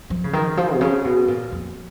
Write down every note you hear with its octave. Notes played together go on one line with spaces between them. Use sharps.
F3
C#3
D#3
F3
B2
C#3
B2
A#2
F2